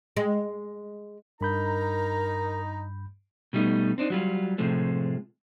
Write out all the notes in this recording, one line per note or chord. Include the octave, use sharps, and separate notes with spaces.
G#3
G2 D#4 A#4 A#5 B5 G6
B2 G3 A3 D#4
C4 D4 D#4
F#3 G3 F4
A2 C3 F3 G#3 A3